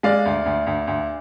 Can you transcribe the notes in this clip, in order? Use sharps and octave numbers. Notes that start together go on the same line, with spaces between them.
G#3 D5 F5
D2
D2
D2
D2